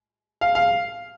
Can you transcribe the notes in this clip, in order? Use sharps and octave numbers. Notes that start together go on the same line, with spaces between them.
F5
F5